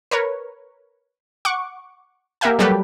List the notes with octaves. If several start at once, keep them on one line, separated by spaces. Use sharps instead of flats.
A#4 B4 C#5
F#5 C#6 D6
A#3 G4 A#4 E5 F#5 G#5
F#3 G3 A#3 G4 A4 B4